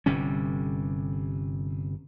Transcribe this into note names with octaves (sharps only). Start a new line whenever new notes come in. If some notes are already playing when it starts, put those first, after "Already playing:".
G1 C3 G3 C#4